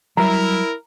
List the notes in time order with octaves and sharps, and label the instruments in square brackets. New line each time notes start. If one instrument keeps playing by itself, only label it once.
[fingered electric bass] F#3 G3 [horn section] E4 A#4 [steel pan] A#5